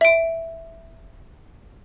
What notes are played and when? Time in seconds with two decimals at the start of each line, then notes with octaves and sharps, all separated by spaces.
0.01 E5 D7